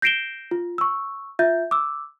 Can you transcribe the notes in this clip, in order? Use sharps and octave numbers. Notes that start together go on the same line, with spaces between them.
G6 A#6 C7 D7 E7 G7
F4
C#6 E6
F4 E5 G6
D6 E6